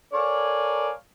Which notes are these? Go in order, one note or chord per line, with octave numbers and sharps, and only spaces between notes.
A4 A#4 C#5 D5 F5 G#5